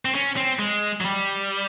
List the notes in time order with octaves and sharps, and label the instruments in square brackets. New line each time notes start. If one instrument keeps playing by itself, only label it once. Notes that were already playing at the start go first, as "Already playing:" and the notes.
[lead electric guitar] C4
C#4
C4
G#3
F#3
G3